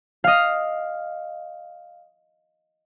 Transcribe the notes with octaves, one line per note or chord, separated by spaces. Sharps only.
D#5 F5